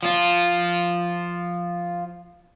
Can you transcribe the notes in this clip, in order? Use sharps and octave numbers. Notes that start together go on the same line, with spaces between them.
F3 F4